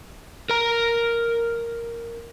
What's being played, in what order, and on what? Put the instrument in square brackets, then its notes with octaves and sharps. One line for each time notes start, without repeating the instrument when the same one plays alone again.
[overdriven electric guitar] A#4 A#5